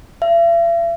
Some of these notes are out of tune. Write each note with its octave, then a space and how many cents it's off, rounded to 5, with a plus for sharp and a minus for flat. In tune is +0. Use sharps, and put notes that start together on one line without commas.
E5 +45